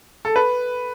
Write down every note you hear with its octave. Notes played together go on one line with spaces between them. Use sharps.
A4
B4